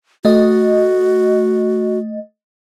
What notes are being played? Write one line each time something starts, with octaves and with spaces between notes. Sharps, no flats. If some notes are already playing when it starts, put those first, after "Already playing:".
A3 F#4 D#5